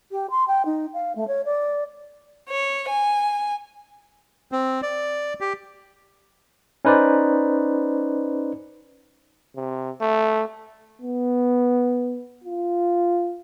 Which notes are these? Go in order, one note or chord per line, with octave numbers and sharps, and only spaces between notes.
G4
C6
G5
D#4
F5
A3
C#5
D5
C#5
G#5
C4
D5
G4
C#4 D#4 B4 C5 D5
C3
A3
B3
F4